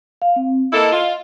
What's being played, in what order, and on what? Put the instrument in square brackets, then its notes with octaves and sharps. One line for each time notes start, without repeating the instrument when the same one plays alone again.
[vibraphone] F5
C4
[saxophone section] A#3 E4 A4 [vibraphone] D#5
[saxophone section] F4